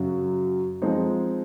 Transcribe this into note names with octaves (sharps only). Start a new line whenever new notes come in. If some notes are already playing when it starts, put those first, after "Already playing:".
Already playing: F#2 C#3 F#3
F3 G#3 C4 D#4